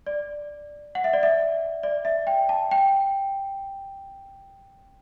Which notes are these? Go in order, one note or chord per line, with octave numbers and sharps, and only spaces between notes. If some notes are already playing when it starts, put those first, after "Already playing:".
D5
F#5
E5
D5
E5
D5
E5
G5
A5
G5